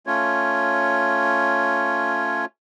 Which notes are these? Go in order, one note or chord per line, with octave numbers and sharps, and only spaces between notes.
A3 C#4 F4 C#5